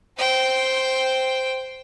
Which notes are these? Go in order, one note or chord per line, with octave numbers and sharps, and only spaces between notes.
C5 G5